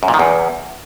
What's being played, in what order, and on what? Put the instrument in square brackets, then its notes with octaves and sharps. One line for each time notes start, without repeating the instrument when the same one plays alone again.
[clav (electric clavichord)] F#2
A#2
D#3
E2